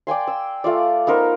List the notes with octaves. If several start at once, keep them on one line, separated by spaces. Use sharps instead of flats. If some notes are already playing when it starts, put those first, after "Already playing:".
D5 G5 G#5 C6
E6
A3 F4 D5
B3 D#4 A#4 C5